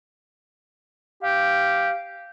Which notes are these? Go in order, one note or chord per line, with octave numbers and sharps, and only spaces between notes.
G4 F5